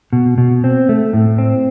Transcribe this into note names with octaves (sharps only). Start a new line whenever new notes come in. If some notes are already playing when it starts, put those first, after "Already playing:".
B2
B2
C4
A3
A2
C4